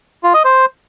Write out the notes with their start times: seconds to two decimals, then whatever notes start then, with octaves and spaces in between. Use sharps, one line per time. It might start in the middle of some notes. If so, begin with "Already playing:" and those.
0.23 F4
0.34 D#5
0.44 C5